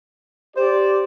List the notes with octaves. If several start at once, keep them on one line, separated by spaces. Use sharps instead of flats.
G4 C5 D5